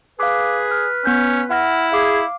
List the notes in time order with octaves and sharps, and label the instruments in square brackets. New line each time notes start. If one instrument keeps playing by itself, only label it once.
[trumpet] G#4 [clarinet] B4 [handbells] F5 D6
[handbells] F6
[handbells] B3 G6 [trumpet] C#4
[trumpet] E4 [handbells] F#5 F6 A#6
[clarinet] G#4 [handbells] F5 D6